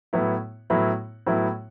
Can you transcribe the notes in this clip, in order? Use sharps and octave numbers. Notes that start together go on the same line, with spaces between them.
A2 F#3 B3 E4
A2 F#3 B3 E4
A2 F#3 B3 E4